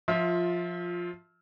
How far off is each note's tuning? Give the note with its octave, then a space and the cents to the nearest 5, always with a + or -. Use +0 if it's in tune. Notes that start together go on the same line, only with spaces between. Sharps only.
F3 +10 F4 +0 E5 -25